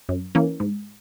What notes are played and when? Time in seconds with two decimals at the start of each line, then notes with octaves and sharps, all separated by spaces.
0.09 F#2
0.35 E3 A#3 C#4
0.60 G#2